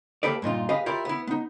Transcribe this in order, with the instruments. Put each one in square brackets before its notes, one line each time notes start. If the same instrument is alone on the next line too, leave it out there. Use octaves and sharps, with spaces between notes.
[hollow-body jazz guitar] A#3 G4 A4 B4 D5
G2 A#2 D#4 F4
G4 G#4 B4 D#5 F5
E4 F4 G4 A#4 C#5 D5
B3 E4
B3 D#4